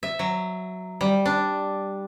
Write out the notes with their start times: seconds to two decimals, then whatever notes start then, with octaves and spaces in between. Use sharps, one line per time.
0.03 E5
0.19 F#3
1.01 G3
1.26 D4